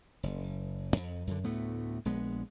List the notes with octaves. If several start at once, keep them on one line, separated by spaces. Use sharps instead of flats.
F#1
F2
F#2 D3
D2 A2 A3 B3
A#1 G#3 B3